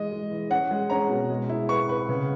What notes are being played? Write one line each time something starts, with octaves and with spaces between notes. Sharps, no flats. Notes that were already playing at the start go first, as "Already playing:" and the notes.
Already playing: E3 G#3 D#5
G#3
E3
C#4 F#5
G#3
C#4 A#5
B2
G#3
E4
B4 C#6
B4
C#3